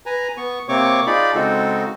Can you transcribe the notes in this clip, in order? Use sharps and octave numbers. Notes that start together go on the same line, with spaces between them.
B4 G#5 A#5
B3 C#6
C3 A#3 C4 C#5 C#6 D6
D#4 F4 G#4 D5 B5
C#3 G#3 C4 D#4 F#4 A4